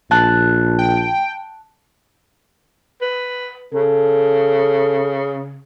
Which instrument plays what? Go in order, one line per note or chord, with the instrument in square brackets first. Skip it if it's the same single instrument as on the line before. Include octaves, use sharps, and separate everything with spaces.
[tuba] A#1 [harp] A5 F#6
[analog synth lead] G5
[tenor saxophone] B4
[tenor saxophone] C#3 [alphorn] A4